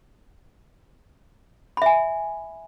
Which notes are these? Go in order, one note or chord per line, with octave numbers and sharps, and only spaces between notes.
E5 G#5 B5